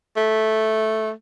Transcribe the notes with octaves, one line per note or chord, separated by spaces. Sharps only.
A3